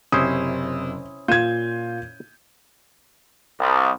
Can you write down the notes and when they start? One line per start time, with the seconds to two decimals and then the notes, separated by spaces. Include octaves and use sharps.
0.12 F#1 C3 C#4 E4 C5 D#6
1.28 A#2 F4 G6 G#6 D#7 E7
3.60 C2